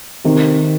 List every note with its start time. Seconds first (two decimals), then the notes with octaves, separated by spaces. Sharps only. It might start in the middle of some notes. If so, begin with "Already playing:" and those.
0.25 C3 D#3